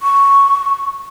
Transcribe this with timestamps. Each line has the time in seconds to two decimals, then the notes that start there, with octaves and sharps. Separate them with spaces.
0.02 C#6